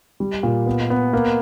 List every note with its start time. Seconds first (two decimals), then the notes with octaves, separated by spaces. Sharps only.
0.20 G3
0.43 A#2
0.66 B3
0.90 B3
1.13 A#3